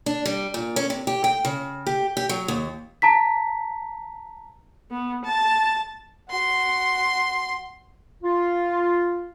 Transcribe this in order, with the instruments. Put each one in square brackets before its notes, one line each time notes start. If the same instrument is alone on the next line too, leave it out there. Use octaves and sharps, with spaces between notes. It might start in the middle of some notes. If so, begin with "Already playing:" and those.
[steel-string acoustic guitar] D4
G3
A#2
C#4
C3
G4
G5
C#3
G4
G4
F#3
D#2
[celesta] A5 A#5 B6
[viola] B3
A5
[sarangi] F#4 [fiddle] C6
[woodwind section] F4